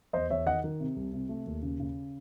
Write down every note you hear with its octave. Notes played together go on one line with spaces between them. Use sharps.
E2 C5 D#5
E2 C#5 E5
D#3 D#5 F#5
D#3
C3
C2
C3
A3
D#2
C#3
C#3